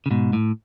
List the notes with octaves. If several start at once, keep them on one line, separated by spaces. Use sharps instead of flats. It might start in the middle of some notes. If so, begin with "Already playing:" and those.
C#3
G#2 B2
A2